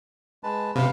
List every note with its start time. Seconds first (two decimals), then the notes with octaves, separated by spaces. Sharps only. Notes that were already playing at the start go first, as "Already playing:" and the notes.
0.44 G#3 B4 A5
0.76 C3 B4 F5